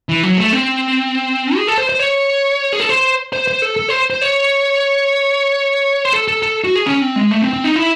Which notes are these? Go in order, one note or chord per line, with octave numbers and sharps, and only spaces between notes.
E3
F#3
A3
C4
G#4
A4
C5
C5
C#5
G#4
A4
C5
C5
C5
A4
A4
C5
C5
C#5
C5
A4
A4
A4
F#4
G#4
C#4
C4
G#3
A3
C4
C4
D#4
E4